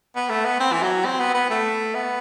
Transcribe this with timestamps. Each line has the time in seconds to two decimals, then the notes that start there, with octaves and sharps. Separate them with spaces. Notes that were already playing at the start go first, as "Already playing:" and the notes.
0.16 B3
0.30 A3
0.45 B3
0.60 C4
0.72 E3
0.82 F#3
1.05 C4
1.20 B3
1.34 B3
1.50 A3
1.95 B3